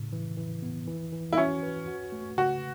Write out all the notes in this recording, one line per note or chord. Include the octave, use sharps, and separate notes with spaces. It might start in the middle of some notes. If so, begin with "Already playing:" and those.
Already playing: A2 C#3
E3
E3
B3
E3
E3
E4
C#4 F#4
B4
F#4
A3
C#3 F#4